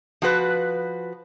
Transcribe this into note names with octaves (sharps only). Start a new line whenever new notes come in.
F3 F#4 B4